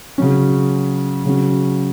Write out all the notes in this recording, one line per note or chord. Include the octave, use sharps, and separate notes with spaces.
C#3 F#3 C#4
C#3 F#3 C#4